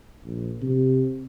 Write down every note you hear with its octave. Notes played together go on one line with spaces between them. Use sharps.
A#1
C3